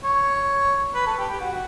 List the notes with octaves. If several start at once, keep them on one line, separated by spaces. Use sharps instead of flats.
C#5
B4
A4
G4
G4
F#4